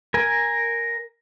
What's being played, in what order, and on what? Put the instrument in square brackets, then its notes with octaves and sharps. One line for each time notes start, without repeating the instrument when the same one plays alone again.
[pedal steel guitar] A#4 G#5